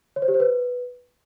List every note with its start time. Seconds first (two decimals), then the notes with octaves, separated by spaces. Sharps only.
0.16 C#5
0.22 C5
0.28 G4
0.34 C5
0.40 B4